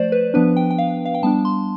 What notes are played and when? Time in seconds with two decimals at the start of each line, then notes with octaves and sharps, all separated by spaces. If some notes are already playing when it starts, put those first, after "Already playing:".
Already playing: F3 A3 C5 D5
0.12 B4
0.34 F3 B3 D4 B4
0.57 G5
0.71 G5
0.78 F5
1.05 F5
1.14 G5
1.23 G3 B3 D4 A5
1.45 C6